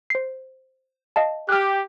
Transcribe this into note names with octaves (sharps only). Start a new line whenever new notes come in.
C5 C7
D#5 F5 A5
G4 F6 F#6